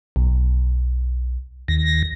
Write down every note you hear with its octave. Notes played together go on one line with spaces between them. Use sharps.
B1
D#2 A#6